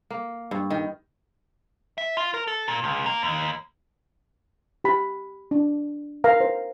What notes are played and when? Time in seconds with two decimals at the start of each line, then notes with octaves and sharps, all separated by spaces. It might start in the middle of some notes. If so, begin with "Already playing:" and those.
0.10 A#3
0.51 G2
0.70 D#3
1.98 E5
2.17 F4
2.34 A#4
2.47 A4
2.68 A#2
2.84 C#2
3.06 A#3
3.23 D#2
4.84 G4 B5
5.51 D4
6.24 A#4 F5 A#5
6.40 C5